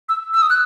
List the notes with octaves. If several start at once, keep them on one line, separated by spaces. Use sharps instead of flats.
E6
E6
D#6
F#6